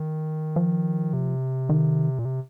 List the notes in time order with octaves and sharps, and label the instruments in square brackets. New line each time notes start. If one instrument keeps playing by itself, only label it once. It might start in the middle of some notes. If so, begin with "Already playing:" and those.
Already playing: [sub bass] D#3
[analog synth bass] F3
[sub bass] C3
[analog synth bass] D#3
[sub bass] A#2
C3